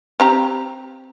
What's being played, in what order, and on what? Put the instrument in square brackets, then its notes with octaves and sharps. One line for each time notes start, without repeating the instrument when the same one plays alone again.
[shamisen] C4 G4 A#5